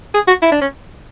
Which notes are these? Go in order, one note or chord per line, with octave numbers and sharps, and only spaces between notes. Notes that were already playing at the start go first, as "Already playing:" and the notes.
G#4
F#4
E4
D4
C#4